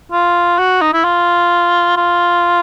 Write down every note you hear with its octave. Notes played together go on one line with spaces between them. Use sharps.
F4
F#4
D#4
E4
F4
F4